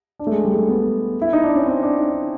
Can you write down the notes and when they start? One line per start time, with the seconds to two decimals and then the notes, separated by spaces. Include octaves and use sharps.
0.19 D4
0.27 A3
0.32 G#3
0.44 G3
0.52 G#3
0.56 A3
0.69 B3
1.21 E4
1.33 D#4
1.44 D4
1.55 C#4
1.66 C4
1.83 D4
1.99 D#4